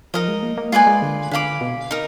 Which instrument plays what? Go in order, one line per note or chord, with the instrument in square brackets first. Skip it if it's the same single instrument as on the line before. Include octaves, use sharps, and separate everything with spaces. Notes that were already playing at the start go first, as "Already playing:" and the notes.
[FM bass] F3 [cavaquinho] D#4 A#4 D#5
[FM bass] G#3
A#3
A#3
[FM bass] G#3 [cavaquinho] F4 B4 D5 G#5
[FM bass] G#3
D3
[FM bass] D3 [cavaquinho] B4 F5 B5 D6
[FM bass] B2
[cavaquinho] D#4 A#4